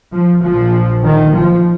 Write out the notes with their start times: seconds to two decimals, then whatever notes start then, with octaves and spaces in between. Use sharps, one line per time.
0.13 F3
0.43 A#1 A#2 F3
1.04 D#3
1.34 F3